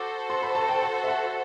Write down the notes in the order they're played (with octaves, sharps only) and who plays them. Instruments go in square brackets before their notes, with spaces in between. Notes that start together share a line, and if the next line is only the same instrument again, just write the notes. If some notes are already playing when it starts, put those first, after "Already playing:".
Already playing: [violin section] F#4 A4 C5 [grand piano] D6
[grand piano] C6
B5
A5
G5
A5
E5
F#5